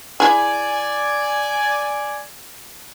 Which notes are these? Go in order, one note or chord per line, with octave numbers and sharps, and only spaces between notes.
E4 G#4 D5 G#5